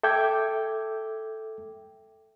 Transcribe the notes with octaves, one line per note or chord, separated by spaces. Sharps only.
A4 E5 G5 D6 G6 G#6